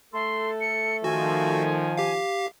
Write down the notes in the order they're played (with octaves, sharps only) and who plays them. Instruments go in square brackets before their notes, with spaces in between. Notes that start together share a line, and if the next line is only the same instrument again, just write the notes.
[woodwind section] A3 A4 [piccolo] C6
[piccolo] C#7
[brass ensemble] D#3 F3 [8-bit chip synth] F#4 [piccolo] G#5
[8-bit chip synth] G4 F5